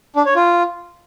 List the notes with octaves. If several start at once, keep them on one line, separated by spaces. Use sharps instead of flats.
D4
C#5
F4